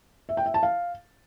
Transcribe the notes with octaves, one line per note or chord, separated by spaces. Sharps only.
E5
G5
E5
A5
F5